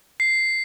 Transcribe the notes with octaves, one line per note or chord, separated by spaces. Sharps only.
C7